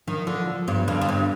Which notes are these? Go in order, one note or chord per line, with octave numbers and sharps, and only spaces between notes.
D#3 F3
D3 F3
F3
G2 B3
F2 D3
F2
G2 B3